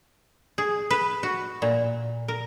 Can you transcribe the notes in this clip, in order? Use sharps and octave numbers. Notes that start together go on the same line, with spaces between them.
G#4
B4
F#4
A#2
A#4